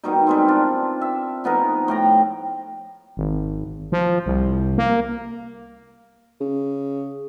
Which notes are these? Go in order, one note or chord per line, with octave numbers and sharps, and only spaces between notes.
B2 D#3 G3 D#4
G3 G#3 C4
D4 F4
E5
F3 B3 D#4 A#4
A2 G5 A#5
G#1
F3
C2
A#3
C#3